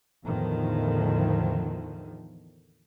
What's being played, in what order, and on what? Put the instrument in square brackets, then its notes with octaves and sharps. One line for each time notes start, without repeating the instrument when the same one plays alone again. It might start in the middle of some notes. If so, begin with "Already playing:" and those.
[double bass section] E2 A2 D3 D#3 F3